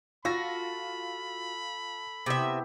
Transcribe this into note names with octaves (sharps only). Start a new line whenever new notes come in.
F4 F#4 A4 B5 A#6
C3 B3 E4 G4 E5